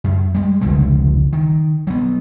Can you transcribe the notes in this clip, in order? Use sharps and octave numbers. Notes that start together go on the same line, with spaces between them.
F#2
G3 G#3
F1 C#2 D3 G#3
D#3
F#3 B3